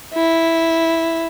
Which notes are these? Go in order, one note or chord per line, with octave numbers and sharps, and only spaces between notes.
E4